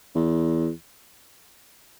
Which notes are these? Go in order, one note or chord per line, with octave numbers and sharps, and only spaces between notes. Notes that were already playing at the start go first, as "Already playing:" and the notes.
E2